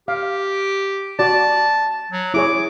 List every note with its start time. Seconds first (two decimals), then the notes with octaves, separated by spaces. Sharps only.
0.08 G4 F5
1.19 F#4 D5 A5
2.12 F#3
2.34 E4 G#4 C#5 D6